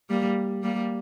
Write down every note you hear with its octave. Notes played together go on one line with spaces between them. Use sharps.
G3 A#3
G3 A#3